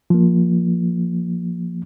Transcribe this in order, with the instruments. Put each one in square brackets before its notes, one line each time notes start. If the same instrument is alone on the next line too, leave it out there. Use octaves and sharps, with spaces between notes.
[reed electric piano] F3 A#3